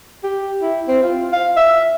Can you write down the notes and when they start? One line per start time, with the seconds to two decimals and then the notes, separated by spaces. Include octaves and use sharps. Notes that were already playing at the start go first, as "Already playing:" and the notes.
0.23 G4
0.62 E4
0.88 C4
1.03 F4
1.33 F5
1.56 E5